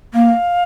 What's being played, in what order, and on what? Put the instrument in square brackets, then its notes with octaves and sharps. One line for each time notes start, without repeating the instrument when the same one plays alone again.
[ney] A#3 [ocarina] F5